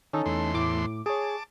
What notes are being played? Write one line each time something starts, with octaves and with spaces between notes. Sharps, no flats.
D#3 C#4 D#4 A4
E2 A3 C6
A2 D6
G#4 C#5 A5 D6